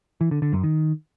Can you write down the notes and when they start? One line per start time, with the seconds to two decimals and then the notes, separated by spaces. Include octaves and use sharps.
0.21 E3
0.31 D3
0.42 D3
0.53 F#2
0.64 D#3